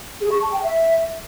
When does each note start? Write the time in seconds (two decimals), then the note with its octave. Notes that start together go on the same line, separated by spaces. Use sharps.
0.21 G#4
0.32 C#6
0.42 A5
0.53 G5
0.63 E5